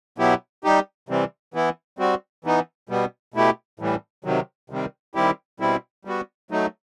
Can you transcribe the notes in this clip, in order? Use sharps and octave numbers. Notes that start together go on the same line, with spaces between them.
B2 F#3 B3 E4 G4
G3 D#4 G4
C3 E3 G3 C4
E3 B3 E4
G3 C4 F#4
E3 B3 D#4
B2 G3 B3
B2 A3 E4 G4
A2 E3 G3
C3 D#3 F#3
C3 D#3 G3 C4
D#3 G3 C4 E4 G4
B2 G3 C4 E4
G3 B3 F#4
F#3 A3 D#4